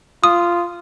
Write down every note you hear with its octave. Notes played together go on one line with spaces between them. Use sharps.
F4 D#6